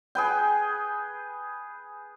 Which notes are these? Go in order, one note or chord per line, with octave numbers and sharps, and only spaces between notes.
G#4 B4 G5